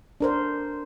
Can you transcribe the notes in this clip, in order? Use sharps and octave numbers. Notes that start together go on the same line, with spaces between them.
D4 A#4 C5